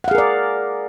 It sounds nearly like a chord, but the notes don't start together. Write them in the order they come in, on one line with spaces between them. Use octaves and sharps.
F#5 F5 G#4 A#4 D5